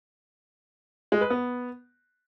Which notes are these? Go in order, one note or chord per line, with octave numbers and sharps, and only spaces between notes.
G#3
B4
B3